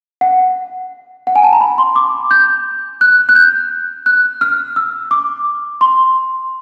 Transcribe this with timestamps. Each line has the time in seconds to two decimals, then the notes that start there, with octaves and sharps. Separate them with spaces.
0.21 F#5
1.27 F#5
1.36 G#5
1.43 A5
1.53 A#5
1.61 B5
1.78 C6
1.96 D6
2.31 G6
3.01 F#6
3.29 F#6
3.35 G6
4.06 F#6
4.41 F6
4.76 E6
5.11 D6
5.81 C6